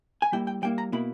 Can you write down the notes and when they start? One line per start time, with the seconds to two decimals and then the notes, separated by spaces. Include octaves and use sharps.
0.22 G#5
0.32 G3 A#3 E4 G5
0.47 G5
0.62 G3 A#3 E4 G5
0.78 A#5
0.92 B2 A#3 E4 B5